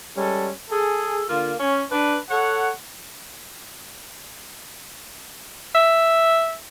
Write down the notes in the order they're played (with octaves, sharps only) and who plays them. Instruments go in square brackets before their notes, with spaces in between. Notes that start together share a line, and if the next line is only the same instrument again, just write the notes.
[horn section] G3 G#3 C#4 A4
G#4 A4
D3 A#3 F4
C#4
D4 B4
A4 C#5 F#5
[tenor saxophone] E5